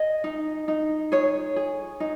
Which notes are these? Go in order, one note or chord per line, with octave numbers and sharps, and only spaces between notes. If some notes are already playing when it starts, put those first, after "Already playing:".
Already playing: G#4 D#5
D#4
D#4
G#4 C#5
G#4
D#4